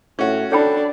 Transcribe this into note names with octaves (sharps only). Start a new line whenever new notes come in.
A2 C#4 F#4
D4 A4 C#5 G5 B5